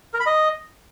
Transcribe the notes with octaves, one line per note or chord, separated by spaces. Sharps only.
A#4
B5
D#5